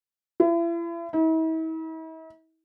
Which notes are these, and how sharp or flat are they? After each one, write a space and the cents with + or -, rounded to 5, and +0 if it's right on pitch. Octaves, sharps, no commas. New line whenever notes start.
E4 +40
E4 -45